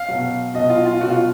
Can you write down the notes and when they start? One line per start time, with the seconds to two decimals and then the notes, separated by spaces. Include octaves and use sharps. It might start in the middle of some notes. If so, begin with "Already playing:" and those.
Already playing: F5
0.08 B2 F#3
0.54 B2 F#3 D#5
0.69 F4
0.86 F4
1.01 B2 F#3 F#4
1.10 F4